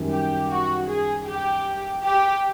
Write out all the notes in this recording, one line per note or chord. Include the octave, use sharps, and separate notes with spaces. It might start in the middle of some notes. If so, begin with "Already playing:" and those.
Already playing: F#2 D#3 G3
G4
F#4
G#4
G4
G4